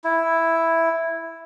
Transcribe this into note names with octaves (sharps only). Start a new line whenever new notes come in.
E4